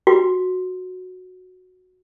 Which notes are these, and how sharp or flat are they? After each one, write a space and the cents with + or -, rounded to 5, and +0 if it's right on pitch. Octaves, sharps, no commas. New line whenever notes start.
F#4 -10